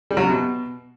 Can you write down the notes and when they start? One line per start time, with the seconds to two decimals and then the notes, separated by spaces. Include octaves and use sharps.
0.11 G3
0.17 F#3
0.23 C3
0.30 B2